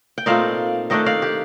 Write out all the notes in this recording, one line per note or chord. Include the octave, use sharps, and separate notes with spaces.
G5
A#2 A3 C4 D#4 D5 F5
D#3 A3 D4 D#5 G5
D5 F5
G4